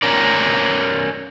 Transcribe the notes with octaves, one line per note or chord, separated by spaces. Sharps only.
C#4 A#4 D5